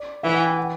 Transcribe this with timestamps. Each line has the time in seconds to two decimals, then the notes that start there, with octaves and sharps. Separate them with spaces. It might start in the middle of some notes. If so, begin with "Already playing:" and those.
Already playing: D5
0.23 E3 E5
0.34 F#5
0.46 G5
0.57 F#5